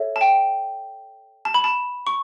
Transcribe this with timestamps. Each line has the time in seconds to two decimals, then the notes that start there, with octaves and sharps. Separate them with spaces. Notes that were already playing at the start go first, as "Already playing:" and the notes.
Already playing: A4 C#5 E5
0.16 A5
0.21 G5
1.45 A5
1.54 B5
1.64 A5
2.07 C#6